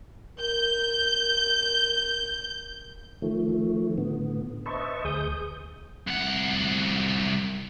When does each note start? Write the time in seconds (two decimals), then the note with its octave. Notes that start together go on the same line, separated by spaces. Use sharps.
0.39 A#4 G6
3.22 D#3 F3 A3
3.98 A2 D3 B3
4.66 B4 C5 D#5 E5 A5 C#6
5.05 D2 G#4 D#6 G6
6.08 C2 F#5